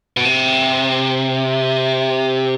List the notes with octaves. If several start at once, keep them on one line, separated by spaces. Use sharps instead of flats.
B2
C3